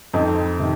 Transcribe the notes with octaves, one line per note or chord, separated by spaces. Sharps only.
F2 C4 D#4
C3 D#3